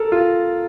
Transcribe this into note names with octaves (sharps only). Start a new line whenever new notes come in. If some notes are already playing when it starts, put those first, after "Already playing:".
Already playing: A4 A#4
F4